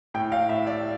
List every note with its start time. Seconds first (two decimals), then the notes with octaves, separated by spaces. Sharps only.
0.14 A2 G5
0.32 F5
0.49 A2 E5
0.67 D5